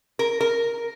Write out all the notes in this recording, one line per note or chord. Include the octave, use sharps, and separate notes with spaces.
A#4
A#4